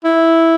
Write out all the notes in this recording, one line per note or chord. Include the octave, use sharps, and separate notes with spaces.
E4